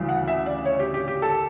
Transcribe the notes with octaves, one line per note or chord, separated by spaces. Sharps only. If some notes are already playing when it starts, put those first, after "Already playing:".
Already playing: D2 C#3 E3 G3
F#5
E5
D5
C#5
G4
G4
G4
A4